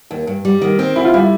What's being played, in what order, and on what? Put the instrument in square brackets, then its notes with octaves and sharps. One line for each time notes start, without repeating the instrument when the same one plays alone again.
[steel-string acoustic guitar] D#2
G2
G3
D#3
C4
[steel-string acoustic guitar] D2 [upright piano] E4
[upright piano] F4
[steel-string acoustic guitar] G3 [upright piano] E4